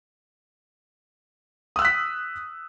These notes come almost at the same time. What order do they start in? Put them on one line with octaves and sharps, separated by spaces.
D#6 E6 F#6 B6